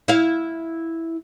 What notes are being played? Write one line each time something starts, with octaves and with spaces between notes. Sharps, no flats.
E4 F5